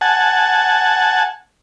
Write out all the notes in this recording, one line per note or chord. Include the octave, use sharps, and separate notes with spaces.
F#5 G#5 A5